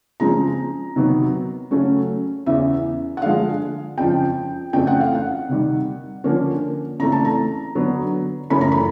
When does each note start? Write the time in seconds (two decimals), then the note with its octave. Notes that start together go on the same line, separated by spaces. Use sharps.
0.20 C#3 F3 G#3 C4 A#5
0.96 C3 D#3 F#3 B3
1.71 C#3 F#3 A3 C#4
2.46 E2 C#3 E3 E5
3.17 F#5
3.22 D3 F3 G#3 F5
3.98 F2 C#3 F3 G5
4.73 F2 C#3 E3 A3 C4 G5
4.87 F#5
5.00 F5
5.15 F#5
5.49 C3 D#3 G3
6.24 D3 F3 A#3 C#4
6.99 C#3 E3 A3 C4 A#5
7.12 A5
7.25 A#5
7.75 D3 F#3 B3
8.50 F#2 C#3 E3 A3 C#4 B5
8.61 A#5
8.72 B5